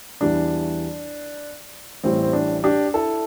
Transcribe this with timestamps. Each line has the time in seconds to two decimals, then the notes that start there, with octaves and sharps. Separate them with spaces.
0.21 E2 E3 G3 D4
2.04 A1 A2 E3 G3 C4
2.22 C4
2.33 D4
2.64 D4 G4
2.94 E4 A4